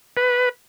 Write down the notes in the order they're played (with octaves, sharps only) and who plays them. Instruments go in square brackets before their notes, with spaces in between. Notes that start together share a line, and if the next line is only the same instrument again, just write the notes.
[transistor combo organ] B4